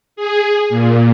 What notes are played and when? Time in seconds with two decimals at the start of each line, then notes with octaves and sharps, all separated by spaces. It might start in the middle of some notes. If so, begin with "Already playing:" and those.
0.16 G#4
0.69 A#2